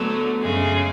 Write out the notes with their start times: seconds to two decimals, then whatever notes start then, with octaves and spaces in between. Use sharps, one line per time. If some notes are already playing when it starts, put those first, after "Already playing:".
Already playing: D2 D3 F#3 A3 B3
0.40 F#2 C#3 G#3